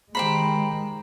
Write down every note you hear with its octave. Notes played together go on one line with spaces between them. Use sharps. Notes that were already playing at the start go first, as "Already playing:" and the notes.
D#3 G#3 G4 C5 A#5 B5